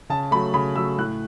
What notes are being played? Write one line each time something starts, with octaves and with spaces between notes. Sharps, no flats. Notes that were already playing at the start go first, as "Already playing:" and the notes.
C#3 A5
F#3 A3 B5
C#3 B5
F#3 A3 E6
A2 F#6